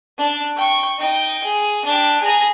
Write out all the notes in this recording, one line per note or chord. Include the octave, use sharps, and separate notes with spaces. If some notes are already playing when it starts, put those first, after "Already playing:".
D4
G5 C#6
D#4 G5
G#4
D4 G4
G#4 A#5